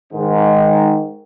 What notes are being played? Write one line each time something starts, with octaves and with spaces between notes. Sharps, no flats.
G#2 D#3